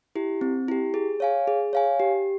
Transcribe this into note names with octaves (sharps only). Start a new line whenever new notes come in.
E4 G4
C4
E4 G4
G#4
C#5 F5 G#5
G#4
C#5 F5 G#5
G4